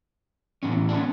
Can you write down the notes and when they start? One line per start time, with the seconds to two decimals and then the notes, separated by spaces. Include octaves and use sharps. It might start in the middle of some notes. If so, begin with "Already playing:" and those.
0.63 A2 E3 B3 C#4
0.89 D4
0.95 B3 C#4